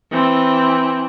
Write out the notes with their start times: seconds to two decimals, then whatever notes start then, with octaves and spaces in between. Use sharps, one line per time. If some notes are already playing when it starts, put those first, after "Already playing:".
0.11 E3 C4